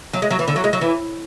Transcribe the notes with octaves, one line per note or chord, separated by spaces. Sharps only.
F#3
G#3
F#3
E3
D3
F#3
G#3
F#3
E3